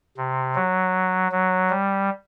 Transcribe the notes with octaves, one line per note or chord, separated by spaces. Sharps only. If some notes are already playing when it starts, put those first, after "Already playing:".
C3
F#3
F#3
G3